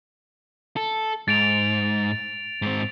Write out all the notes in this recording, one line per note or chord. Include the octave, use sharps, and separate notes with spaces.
A4
G#2 A6 D7 F7
G#2 C4